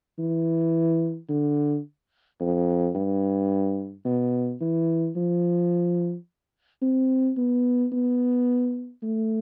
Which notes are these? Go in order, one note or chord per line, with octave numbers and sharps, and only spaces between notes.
E3
D3
F2
G2
B2
E3
F3
C4
B3
B3
A3